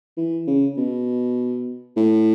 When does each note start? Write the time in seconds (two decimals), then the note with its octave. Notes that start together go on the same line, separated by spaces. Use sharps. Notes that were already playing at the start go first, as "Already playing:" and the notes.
0.17 E3
0.47 C#3
0.77 B2
1.97 A2